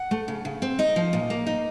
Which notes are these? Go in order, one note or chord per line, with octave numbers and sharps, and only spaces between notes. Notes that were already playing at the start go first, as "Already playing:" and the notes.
Already playing: F#5
A3
C#3
C#3
C4
D#4 D#5
F3
A#2
A#3
D#4